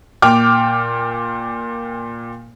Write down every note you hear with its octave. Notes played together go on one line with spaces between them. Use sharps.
A#2 G5 D6 F6